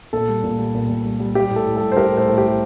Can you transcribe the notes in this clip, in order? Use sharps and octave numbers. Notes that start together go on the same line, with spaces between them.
A#2 A4
G3
A#2
G3
A#2
A#2
G3
G3
G3 G4
A2
A4
A2
G3 A4
C5
G3 G4 A#4
A2
A4 C5
A2
G3 G4